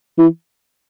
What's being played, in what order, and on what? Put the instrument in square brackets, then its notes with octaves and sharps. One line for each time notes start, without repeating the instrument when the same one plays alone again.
[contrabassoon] E3